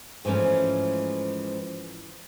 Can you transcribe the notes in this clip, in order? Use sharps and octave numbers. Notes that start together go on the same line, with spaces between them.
G#2 E3 F3 A3 C#4